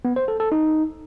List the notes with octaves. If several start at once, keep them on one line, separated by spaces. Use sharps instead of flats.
B3
C5
A4
A4
D#4